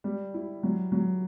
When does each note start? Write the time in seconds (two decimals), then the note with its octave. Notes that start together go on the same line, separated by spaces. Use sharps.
0.04 G3
0.34 E4
0.63 F#3
0.92 F#3